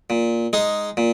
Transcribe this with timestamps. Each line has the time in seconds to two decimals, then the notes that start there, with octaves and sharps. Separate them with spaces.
0.10 A#2
0.53 G#3 D#4 G#4
0.97 A#2